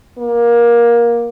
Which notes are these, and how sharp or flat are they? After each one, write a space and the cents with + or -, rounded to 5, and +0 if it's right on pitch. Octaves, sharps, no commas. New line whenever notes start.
A#3 +20